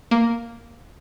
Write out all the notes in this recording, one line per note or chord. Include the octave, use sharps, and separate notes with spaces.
A#3